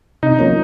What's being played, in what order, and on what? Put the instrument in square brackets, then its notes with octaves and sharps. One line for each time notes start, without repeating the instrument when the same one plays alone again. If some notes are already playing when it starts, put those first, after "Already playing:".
[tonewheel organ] C3 [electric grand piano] D#4
[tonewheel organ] F3 A#3 C#4